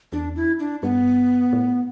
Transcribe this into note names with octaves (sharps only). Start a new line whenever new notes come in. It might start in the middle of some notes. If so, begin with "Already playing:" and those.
E2 D4
E4
D4
G2 B3
A2